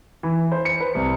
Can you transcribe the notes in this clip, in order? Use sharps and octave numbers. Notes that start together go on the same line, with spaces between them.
E3
C5
C#7
B4
C2